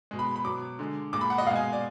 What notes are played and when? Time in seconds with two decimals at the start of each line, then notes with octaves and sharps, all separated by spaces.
0.11 B2 G#3
0.19 B5
0.36 B5
0.45 B2 F#3 D6
0.79 D3 G#3
1.13 A#2 G#3 D6
1.21 B5
1.30 F#5
1.38 D#5
1.47 B2 G#3 F5
1.56 G#5
1.73 D5